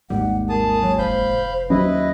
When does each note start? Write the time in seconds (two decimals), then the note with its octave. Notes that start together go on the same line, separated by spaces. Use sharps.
0.10 G#1 D#2 G#2 G3 F#5
0.49 G#4 A#4 A5 D#6
0.83 F#3 C#5
0.99 F1 C5 F5 B5 G6
1.70 D#2 F#3 C#4 E4 B4 D#5